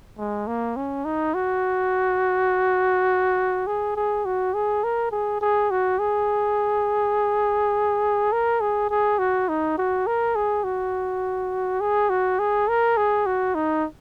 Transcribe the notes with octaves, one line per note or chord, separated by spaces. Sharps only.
G#3
A#3
C#4
D#4
F#4
G#4
G#4
F#4
G#4
A#4
G#4
G#4
F#4
G#4
A#4
G#4
G#4
F#4
D#4
F#4
A#4
G#4
F#4
G#4
F#4
G#4
A#4
G#4
F#4
D#4